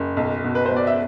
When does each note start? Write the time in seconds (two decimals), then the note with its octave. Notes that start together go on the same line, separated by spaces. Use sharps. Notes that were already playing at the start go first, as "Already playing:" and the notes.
Already playing: F#1
0.17 B1
0.44 B2
0.55 B4
0.66 C5
0.71 B2
0.76 D5
0.87 E5